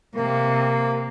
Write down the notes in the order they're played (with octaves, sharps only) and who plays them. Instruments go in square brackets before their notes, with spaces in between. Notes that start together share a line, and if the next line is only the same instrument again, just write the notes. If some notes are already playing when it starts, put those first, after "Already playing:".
[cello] C3 [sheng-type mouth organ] A#3